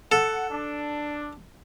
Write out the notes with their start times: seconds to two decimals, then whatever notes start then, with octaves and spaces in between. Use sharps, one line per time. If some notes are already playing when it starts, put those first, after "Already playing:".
0.12 A4 F#5
0.50 D4